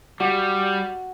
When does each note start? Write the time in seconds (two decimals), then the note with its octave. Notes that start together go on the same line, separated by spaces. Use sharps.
0.20 G3 F#4